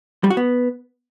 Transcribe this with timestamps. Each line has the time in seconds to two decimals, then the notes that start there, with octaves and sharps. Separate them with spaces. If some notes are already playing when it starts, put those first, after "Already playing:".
0.24 G3
0.30 F#4
0.37 B3